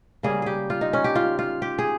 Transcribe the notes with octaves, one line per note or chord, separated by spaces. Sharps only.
C#3 G3 A#3 G#4
G4 G#4
F4
D#4
C#4
G4
F4
F4
G4
G#4